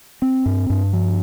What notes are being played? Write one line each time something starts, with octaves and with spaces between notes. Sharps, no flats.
C4
G2
G2
F3